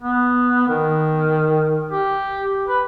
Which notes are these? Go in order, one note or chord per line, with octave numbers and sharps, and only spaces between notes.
B3
D#3
G4
B4